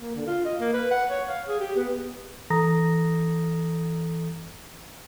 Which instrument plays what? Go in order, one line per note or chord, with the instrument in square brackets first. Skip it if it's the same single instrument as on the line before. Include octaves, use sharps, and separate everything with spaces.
[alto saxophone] A#3
D3
F4
D#5
A#3
B4
F#5
C#5
F5
G#4
G4
B3
[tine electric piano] E3 A4 A#5 D#6 A#6